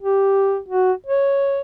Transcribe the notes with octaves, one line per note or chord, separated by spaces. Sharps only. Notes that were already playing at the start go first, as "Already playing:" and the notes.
G4
F#4
C#5